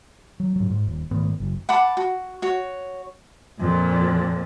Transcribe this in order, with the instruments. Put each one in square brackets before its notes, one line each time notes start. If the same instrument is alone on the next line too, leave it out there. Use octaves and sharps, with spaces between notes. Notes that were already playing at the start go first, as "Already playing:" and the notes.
[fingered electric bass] F#3
G#2 F#3
G#2
D#1
G#2 D#3 A3 B3
F#1
[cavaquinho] F#5 A5 B5 D6
F#4
F#4 C#5
[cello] F2 A#2